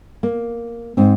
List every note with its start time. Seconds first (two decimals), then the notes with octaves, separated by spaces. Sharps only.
0.23 A#3
0.97 G#2 C4